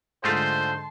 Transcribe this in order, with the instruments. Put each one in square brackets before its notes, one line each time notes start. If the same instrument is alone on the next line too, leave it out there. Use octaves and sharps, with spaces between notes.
[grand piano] G#2 D3 [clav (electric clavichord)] G#3 A3 F4 [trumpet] C5 [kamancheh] A5 C6